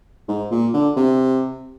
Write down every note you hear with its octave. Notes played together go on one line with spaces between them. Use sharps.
G#2
A#2
D3
C3